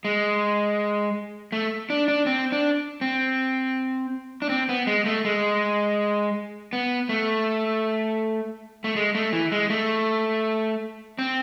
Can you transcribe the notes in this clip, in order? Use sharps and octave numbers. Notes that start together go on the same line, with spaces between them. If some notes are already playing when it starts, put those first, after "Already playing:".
G#3
A3
D4
D4
C4
D4
C4
D4
C4
B3
G#3
A3
G#3
B3
A3
A3
G#3
A3
E3
G#3
A3
C4